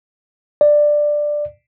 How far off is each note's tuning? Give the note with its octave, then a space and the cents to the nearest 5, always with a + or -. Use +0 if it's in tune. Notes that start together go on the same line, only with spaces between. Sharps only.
D5 +10